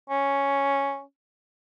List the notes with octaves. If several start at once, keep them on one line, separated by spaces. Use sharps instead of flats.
C#4